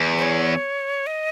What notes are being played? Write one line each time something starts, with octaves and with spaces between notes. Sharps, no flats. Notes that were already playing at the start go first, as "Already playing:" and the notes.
Already playing: E2
C5
C#5
D#5